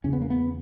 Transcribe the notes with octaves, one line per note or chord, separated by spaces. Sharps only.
E2 C#3 C#4
B3
A#3
B3